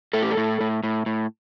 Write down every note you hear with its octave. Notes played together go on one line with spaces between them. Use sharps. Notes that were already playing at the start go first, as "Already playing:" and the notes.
A2 A4
G4
A4
A2
A2
A2
A2